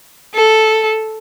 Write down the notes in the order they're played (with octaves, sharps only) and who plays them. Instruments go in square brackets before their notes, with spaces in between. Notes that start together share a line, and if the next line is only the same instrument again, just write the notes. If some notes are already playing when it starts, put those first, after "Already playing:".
[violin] A4